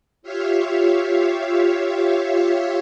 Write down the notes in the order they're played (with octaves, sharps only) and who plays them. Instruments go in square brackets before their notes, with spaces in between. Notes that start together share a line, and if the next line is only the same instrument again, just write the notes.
[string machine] F4 G4 C#5 E5 F5